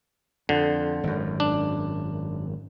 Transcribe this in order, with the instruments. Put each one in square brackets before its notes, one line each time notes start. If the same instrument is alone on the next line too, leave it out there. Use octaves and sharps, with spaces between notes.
[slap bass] F2 [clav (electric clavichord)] D3
[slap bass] G#1 F#2
[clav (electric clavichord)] D4